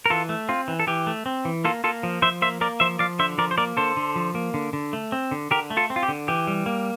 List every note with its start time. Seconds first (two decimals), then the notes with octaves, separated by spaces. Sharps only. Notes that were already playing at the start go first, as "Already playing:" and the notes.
0.06 A#4
0.10 E3 F4 A4
0.29 A3
0.49 C4 F4
0.68 E3
0.80 A4
0.87 E3 G4
1.07 A3
1.26 C4
1.45 E3
1.65 A#3 F4 A4
1.84 A#3 F4 A4
2.03 F3
2.22 F3 C5 E5
2.42 A#3 C5 E5
2.61 A#3 A#4 D5
2.80 F3 C5 E5
2.99 F3 D5 F5
3.19 D3 C5 E5
3.38 F3 A#4 D5
3.51 C5
3.58 A#3 A#4 D5
3.77 D3 A4 C5
3.97 D3
4.16 F3
4.35 A#3
4.54 D3
4.73 D3
4.93 A3
5.12 C4
5.31 D3
5.51 D3 G4 A#4
5.70 A3
5.77 F4 A4
5.90 C4
5.96 F4
6.03 G4
6.08 D3
6.28 E3 G4
6.47 G3
6.66 A#3